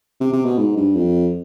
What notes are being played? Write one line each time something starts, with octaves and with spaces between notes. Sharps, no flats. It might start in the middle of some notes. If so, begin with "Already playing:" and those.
C3
C3
B2
G#2
G2
F2